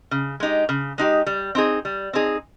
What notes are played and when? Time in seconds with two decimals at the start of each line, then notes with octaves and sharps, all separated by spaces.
0.11 C#3
0.40 G#3 D#4 G4
0.69 C#3
0.98 G#3 D#4 G4
1.26 G3
1.55 C4 D#4 G#4
1.85 G3
2.13 C4 D#4 G#4